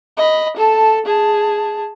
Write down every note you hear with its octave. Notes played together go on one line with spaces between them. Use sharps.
D#5 B5
A4 A5
G#4 A5